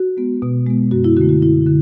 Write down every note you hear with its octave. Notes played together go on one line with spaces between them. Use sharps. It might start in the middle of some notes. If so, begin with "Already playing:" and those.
Already playing: F#4
G#3 B3
B2
G#3 B3
F#2 F#4
E4
D3 A3 F#4
F#4
F#2 E4
D3